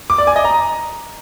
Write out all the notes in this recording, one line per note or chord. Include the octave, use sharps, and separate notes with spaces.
D6
D5
G#5
D#5
A#5